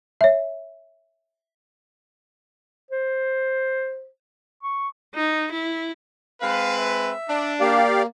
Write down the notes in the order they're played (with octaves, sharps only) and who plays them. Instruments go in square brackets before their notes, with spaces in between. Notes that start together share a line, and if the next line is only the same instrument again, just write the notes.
[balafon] C#5 E5
[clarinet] C5
C#6
[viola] D#4
E4
[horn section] G#3 C4 B4 [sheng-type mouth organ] F5
[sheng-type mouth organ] E5
[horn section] D4
[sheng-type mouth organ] A#3 [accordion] G4 D5 F5